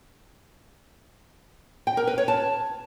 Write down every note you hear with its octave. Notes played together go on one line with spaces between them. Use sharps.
G5
A#4
B4
C#5
A5